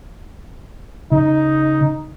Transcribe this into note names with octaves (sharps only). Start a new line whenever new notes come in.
C#3 D#4